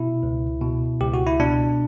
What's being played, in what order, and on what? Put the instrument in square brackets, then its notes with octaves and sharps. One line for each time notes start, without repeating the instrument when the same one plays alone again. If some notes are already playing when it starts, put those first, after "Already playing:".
Already playing: [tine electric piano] B2 E4
C#2
B2
C#2 G4
F#4
E4
B2 D4